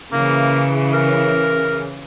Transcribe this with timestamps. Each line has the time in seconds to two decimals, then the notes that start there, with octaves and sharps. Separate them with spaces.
0.13 C#3 E3 A#3
0.93 A#4